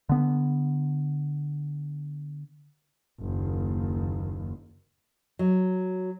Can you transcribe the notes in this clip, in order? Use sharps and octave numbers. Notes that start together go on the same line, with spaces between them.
D3 B3
F#1 D#2
F#3